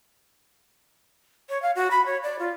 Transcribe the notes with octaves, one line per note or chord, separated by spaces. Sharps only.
C#5
F5
F#4
B5
C#5
D5
F4